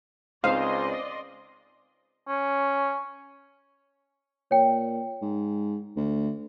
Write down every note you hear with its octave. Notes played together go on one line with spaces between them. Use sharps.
C#2 C4 D#4 C5 D5 D#5 F5 C6
C#4
A#2 C#5 G5
G#2
D2